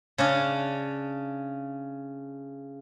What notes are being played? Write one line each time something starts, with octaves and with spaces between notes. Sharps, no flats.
C#3 C#4 D4